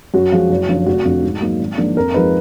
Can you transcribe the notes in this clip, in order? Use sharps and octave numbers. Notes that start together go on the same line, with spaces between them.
F#2 F#4
F3 G#3
F#1
F#2 D3 F3
F1 F#4
F2 D3 F3
G#2
F#3 A#3 D#4
G#1
G#2 F3 A#3 D4
F2 A#4
F3 G#3 D#4 B4